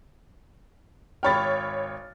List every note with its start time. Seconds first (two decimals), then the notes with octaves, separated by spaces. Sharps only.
1.23 G#1 C#5 G5 B5 F6 A6